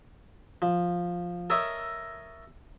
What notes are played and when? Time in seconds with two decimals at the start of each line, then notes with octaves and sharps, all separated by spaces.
0.62 F3
1.50 A4 A#4 C#5 D#5 E5 A#5